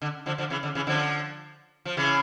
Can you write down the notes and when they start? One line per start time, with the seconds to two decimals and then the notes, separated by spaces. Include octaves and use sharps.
0.02 D3
0.26 D3 F3
0.38 D3 F3
0.50 C#3 E3
0.63 D3
0.75 C#3 E3
0.87 D3 F3
1.85 F3
1.97 C#3 E3